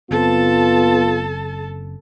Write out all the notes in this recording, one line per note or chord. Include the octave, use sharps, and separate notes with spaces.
F#1 B3 C4 F4 A4 A5